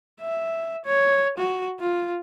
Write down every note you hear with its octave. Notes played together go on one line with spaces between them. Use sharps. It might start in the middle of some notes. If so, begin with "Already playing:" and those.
E5
C#5
F#4
F4